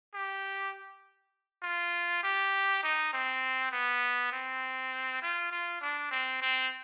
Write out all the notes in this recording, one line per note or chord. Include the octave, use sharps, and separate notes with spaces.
G4
F4
G4
D#4
C4
B3
C4
F4
F4
D4
C4
C4